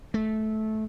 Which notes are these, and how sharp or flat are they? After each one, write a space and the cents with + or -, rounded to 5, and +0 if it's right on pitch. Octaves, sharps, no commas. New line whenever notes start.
A3 -15